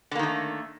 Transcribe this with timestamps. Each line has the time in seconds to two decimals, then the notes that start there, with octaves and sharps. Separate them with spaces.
0.11 D3
0.15 A#3
0.19 D#3
0.23 A3